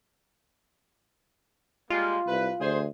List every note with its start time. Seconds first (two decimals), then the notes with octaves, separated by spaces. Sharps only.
1.90 G3 G#3 A#3 F4
2.27 C2 B4
2.60 D2 G#4 C5